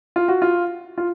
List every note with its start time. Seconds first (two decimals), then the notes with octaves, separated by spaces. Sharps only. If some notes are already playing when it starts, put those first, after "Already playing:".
0.16 F4
0.28 F#4
0.42 F4
0.98 F4